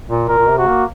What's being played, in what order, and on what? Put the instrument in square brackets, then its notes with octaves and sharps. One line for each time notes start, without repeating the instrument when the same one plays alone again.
[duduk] A#2
[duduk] A#2 [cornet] A#4
[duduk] A#2
C3
[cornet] F#4
[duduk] A#3